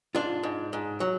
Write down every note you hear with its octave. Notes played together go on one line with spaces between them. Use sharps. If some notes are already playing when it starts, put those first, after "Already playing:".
G#2 D4 F4
G#2
G#2
F#3